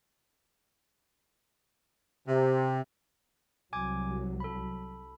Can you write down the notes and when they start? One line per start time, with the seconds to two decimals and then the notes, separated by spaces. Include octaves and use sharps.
2.27 C3
3.73 C2 F#3 G#5 D6 G#6
4.40 A4 B5